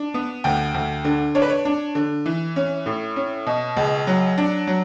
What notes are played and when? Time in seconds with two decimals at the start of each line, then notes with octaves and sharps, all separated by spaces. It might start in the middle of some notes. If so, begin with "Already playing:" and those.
Already playing: D4
0.14 B3
0.44 D2 G5
0.74 D2
1.05 D3
1.35 D4 C#5
1.42 B4
1.50 C#5
1.65 D4
1.95 D3
2.26 E3
2.56 C#4
2.86 A2
3.16 C#4
3.46 B2
3.77 C#2
4.07 F#3
4.38 D4
4.67 F#3